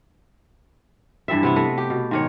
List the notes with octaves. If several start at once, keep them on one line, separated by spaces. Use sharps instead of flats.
G2 E3 G3 E5
C3 B3 E4
A3 D#5
G4
B2
G#2 D#3 C#5